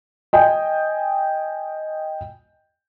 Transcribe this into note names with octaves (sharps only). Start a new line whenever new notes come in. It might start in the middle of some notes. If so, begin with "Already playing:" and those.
D#5 G5 G#5